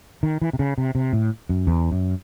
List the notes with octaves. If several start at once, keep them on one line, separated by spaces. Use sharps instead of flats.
D#3
E3
C3
C#3
C3
C3
A2
F#2
E2
F#2